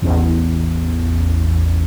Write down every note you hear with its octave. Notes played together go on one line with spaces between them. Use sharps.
A1 E2